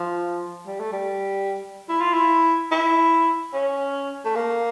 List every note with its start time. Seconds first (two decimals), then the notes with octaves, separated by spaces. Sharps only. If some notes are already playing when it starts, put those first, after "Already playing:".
Already playing: F3
0.67 G3
0.80 A3
0.92 G3
1.89 E4
2.01 F4
2.14 E4
2.72 E4
3.53 C#4
4.25 A3
4.36 A#3